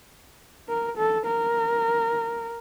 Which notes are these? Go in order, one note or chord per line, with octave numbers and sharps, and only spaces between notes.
A#4
A4
A#4